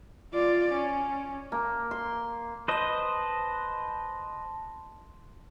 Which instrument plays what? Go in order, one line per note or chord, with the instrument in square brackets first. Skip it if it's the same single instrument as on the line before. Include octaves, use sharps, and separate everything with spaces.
[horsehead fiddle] F4 D5
C#4
[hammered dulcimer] A#3
C6
[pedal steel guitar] B4 C5 D#5 [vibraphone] A5 C6